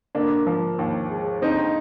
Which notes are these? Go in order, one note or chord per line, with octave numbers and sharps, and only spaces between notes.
D3 A#3 D4
F3
D#2
G#3
D3 C4 D#4